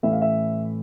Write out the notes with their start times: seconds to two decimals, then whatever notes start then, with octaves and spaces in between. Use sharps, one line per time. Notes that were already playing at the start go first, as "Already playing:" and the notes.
0.03 A1 A2 E3 E5
0.12 F5
0.21 E5